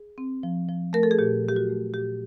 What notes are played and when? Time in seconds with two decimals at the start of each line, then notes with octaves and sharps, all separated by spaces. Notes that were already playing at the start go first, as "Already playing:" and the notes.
Already playing: G#4
0.18 C4
0.43 F3
0.69 F3
0.93 A3 A#4
1.03 A4
1.11 G#4
1.19 A#2 G4
1.44 F#3 G4
1.56 F#4
1.69 A3
1.94 A#2 G4